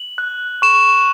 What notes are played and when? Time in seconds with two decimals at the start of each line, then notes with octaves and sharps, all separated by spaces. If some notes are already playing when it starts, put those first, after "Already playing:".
Already playing: F#7
0.18 F#6
0.62 C#6 E7